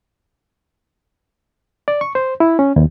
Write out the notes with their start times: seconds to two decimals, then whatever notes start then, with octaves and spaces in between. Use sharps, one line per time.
1.88 D5
2.01 C#6
2.15 C5
2.40 E4
2.59 C#4
2.76 D#2